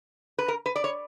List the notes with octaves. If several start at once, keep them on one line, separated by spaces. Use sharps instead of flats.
B4
A#4
B4
D5
C#5